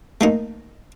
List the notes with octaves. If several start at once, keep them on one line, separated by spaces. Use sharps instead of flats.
A3 A#3 D#4